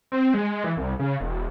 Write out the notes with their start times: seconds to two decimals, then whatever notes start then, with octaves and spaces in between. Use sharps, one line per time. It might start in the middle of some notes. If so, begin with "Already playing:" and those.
0.12 C4
0.34 G#3
0.64 E3
0.77 C2
0.99 C#3
1.20 E1